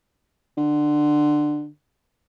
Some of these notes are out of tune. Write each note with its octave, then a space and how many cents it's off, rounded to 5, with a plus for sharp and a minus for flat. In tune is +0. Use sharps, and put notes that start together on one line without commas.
D3 +20